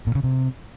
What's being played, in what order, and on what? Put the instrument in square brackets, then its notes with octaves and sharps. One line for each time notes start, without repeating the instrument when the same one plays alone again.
[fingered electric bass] A#2
C#3
C3